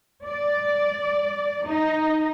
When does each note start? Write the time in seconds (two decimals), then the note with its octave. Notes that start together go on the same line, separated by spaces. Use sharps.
0.25 D5
1.64 D#4